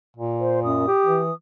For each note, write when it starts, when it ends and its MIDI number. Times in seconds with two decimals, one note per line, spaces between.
0.17 0.91 46
0.40 0.60 72
0.64 0.84 42
0.64 1.34 87
0.87 1.21 67
1.06 1.31 52